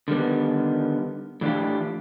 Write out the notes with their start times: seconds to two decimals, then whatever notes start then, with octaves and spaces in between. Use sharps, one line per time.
0.08 D3 D#3 G3 B3
1.41 A2 E3 D4 F4 G4